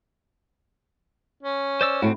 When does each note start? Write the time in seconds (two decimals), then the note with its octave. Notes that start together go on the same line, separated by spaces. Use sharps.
1.43 C#4
1.81 C5 D5 E6
2.02 A2 C4 E4 F#4